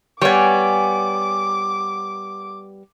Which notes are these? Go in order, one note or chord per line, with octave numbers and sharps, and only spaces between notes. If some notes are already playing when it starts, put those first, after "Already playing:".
G3 B3 C#5 G#5 D6